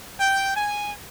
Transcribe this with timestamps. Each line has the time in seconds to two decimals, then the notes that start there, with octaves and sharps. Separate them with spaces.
0.20 G5
0.55 G#5